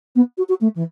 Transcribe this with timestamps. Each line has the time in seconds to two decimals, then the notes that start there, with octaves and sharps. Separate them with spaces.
0.15 B3
0.38 F#4
0.49 F#4
0.61 A3
0.75 E3